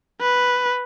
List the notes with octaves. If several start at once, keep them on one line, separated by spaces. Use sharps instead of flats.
B4